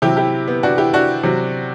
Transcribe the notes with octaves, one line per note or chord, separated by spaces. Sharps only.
C3 F#3 E4 G4
E4 G4
B3
D4 F#4
E4 G4
D4 F#4
C3 F#3